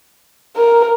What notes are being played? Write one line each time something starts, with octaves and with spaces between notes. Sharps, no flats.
A#4